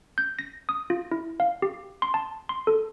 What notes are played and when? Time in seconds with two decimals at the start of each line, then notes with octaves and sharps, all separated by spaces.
0.18 G6
0.39 A#6
0.69 D#6
0.90 F4
1.11 E4
1.40 F5
1.62 G4
2.02 C6
2.14 A5
2.49 C6
2.67 A4